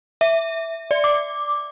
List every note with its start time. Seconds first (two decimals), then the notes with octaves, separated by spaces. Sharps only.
0.21 E5
0.91 D5
1.04 D6